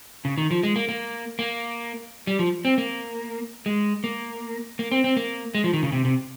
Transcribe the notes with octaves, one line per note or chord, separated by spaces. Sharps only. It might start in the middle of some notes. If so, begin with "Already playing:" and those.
C#3
D#3
F3
G#3
A#3
A#3
A#3
G3
F3
C4
A#3
G#3
A#3
A#3
C4
C4
A#3
G#3
F3
D#3
C#3
C3
C3